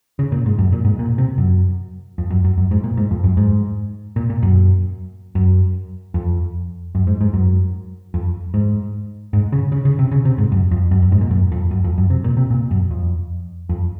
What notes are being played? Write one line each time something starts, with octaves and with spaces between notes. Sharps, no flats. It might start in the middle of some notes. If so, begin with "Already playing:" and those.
C#3
A#2
G#2
F#2
A#2
G#2
A#2
C3
F#2
F2
F#2
F#2
F#2
G#2
A#2
G#2
F2
F#2
G#2
A#2
A#2
F#2
F#2
F2
F#2
G#2
G#2
F#2
F2
G#2
G#2
C#3
C#3
C#3
C3
C#3
C3
G#2
F#2
F2
F#2
F#2
G#2
A#2
F#2
F2
F#2
F2
F#2
C3
A#2
C3
A#2
F#2
F2
F2